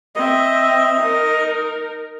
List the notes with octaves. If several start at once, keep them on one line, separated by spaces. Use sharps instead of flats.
C4 D#5 E5
D#4 A#4